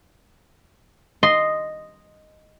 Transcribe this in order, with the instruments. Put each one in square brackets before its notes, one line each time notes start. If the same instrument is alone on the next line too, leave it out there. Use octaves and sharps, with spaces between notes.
[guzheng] D#5 C6